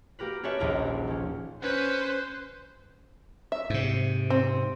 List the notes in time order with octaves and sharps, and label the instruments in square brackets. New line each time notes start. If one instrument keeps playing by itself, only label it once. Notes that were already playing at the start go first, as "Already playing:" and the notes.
[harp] A#3 F#4 G4 A#4 B4
C#4 G4 A4 B4 C#5 E5
D#1 A#1 D#2 A#3 A#5 D#6
F3 C#4
[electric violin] C#4 B4 [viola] C5
[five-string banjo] E5
[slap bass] G#2 C3
[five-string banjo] C4